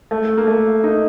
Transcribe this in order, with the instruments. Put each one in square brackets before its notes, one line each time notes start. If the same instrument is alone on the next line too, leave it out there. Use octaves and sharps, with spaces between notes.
[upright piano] A3
A#3
A3
D#4